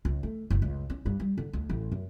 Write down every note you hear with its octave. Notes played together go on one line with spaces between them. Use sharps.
C#2
A3
F#1
C#2
C#4
G2
G3
D3
D2
A1
F#2